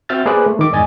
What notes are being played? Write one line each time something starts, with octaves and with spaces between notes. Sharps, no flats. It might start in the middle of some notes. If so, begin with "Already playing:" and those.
C4 F#4 E5 F6 G6 A6
A#3 G#4 B4 C5 D5 F#6
A3
D#3 D6
E2 G#2 D5 D#5 G#5 A6